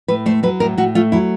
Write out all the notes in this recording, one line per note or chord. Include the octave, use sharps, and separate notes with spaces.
A2 B4
A3 C5
F#3 B4
A2 A#4
A2 F#4
A3 F4
F#3 E4